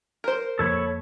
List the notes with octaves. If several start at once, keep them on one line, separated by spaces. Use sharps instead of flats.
A#4 C5
F2 F3 A#3 A4 C#5 B5